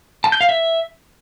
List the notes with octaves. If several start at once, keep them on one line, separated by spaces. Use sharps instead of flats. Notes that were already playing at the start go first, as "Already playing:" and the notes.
A5
G6
F5
E5